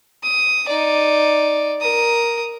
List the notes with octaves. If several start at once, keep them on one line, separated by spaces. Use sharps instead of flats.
D#6
D#4 D5
A#4 D#6